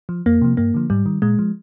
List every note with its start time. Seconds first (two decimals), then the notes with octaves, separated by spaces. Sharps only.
0.09 F3
0.26 F2 A#3
0.41 C3 F3
0.57 G2 A#3
0.74 D3 F3
0.90 G#2 G3
1.06 D#3
1.22 A#2 G#3
1.39 F3